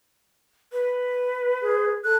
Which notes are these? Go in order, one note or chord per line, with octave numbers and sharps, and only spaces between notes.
B4
G#4
A4 F#6